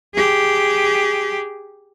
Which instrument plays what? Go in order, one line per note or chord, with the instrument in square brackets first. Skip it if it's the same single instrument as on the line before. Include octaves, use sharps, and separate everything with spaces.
[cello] G4 G#4